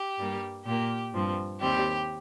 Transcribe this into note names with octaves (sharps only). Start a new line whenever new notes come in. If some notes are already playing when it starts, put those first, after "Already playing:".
Already playing: G4
G2 G3 A#3
A#2 A#3 G4
G2 F3 C4
D#2 D#3 G3 C4 G4